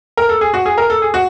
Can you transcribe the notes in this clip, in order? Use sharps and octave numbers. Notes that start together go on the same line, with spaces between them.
A#4
A4
G#4
F#4
G#4
A#4
A4
G#4
F#4